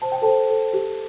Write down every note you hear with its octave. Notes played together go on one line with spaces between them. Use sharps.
C5 A5
G5
A4 C5 A5
A4
G4